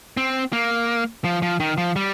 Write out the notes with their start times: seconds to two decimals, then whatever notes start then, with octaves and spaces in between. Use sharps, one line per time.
0.17 C4
0.53 A#3
1.24 F3
1.42 F3
1.60 D#3
1.78 F3
1.96 G3